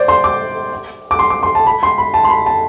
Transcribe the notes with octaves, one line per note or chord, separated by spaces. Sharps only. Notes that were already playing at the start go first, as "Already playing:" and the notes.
Already playing: C5 D5
C6
D6
D6
C6
D6
C6
A5
B5
C6
B5
A5
C6
B5
A5